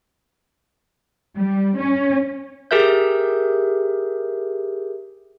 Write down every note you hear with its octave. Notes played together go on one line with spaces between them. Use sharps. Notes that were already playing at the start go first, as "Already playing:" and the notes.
G3
C#4
G4 G#4 A#4 E5 G6